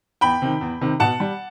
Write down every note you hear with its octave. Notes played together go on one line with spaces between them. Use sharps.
E2 G5 B5
C3 D#3
E2
C3 D#3
B2 F#5 A5
G3